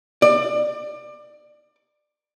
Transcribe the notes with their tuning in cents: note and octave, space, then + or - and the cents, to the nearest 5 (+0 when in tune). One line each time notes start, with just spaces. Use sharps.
D5 +25